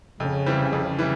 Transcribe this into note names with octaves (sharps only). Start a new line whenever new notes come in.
F2 C#3
E3 G3 C4
F2
E3 G3